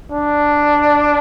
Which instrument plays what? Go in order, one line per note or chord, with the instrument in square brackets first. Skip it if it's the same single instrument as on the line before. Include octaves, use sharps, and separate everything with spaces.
[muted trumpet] D4